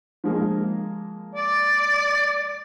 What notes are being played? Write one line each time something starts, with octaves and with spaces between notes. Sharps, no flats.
F3 G#3 A#3
D5